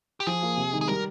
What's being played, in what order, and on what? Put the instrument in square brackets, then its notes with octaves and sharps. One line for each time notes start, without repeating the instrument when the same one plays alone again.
[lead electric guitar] G4
[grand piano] F3 [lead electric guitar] G#4
[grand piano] A#3 F4
C3
D#3 G#3 D#4
[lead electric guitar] G#4
[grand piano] G3 [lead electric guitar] A#4